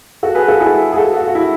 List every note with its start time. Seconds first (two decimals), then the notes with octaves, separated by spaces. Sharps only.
0.23 F#4 A4
0.35 G#4 B4
0.48 F#4 A4
0.60 E4 G#4
0.92 G#4
0.97 F#4 A4
1.16 F#4
1.28 F#4
1.35 E4